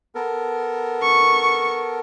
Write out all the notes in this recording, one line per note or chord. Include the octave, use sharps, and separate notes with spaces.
B3 A4 A#4
C#6